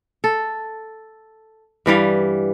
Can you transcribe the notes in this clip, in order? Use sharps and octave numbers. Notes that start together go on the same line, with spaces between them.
A4
G2 E3 G3 F5